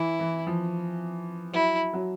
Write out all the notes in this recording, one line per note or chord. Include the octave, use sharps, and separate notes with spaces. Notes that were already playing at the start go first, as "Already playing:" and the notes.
Already playing: E3 E4
E3
F3
F#3 E4
F#3